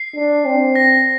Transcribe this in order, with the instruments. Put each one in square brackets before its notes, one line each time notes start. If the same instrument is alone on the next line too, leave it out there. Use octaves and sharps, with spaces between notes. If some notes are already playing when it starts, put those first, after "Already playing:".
Already playing: [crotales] C7
[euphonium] D4
C4
[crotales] A#6